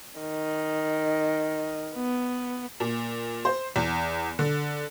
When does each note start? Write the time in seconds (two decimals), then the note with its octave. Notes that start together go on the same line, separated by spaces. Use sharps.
0.19 D#3
1.94 B3
2.80 A#2
3.45 C5
3.76 E2
4.39 D3